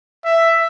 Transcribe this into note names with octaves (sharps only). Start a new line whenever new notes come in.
E5